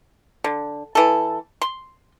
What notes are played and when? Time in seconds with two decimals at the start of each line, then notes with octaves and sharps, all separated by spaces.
0.44 D3
0.95 E3 A4
1.62 C6